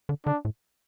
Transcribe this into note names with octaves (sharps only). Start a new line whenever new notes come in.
D3
D3 D4
A2